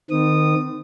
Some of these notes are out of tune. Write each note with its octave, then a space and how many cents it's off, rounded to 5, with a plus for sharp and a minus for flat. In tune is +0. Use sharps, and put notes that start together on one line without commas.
D#3 -15 C4 -40 D#6 -15